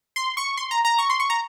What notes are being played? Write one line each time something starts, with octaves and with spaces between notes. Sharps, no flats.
C6
C#6
C6
A#5
A#5
C#6
C6
C#6
A#5